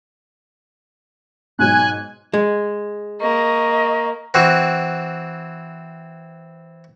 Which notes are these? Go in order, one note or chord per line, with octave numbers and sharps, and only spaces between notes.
G#2 B2 F#3 G#5 F#6
G#3
A#3 D#5 C#6
E3 C4 F#4